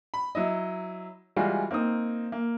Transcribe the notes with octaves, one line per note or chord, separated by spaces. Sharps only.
B5
F#3 E4 D#5
E3 G3 G#3 F4 F#4
A#3 C4 D#4 D#6
A#3